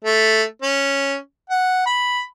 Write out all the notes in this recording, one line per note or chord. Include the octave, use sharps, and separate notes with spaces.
A3
C#4
F#5
B5